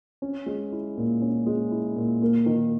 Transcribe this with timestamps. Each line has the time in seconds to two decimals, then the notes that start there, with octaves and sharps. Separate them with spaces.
0.22 C#4
0.46 G#3
0.72 E4
0.97 A#2
1.22 C#4
1.46 G#3
1.71 E4
1.96 A#2
2.22 A#3
2.46 D#3